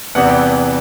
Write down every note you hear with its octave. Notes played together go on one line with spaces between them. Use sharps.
E2 C3 E3 G3 B3 F#5
G5